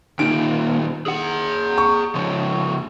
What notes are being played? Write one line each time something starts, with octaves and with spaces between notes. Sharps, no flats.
D#2 A#2 D#3 D7
G#4 F#5
C#6
C#3 F3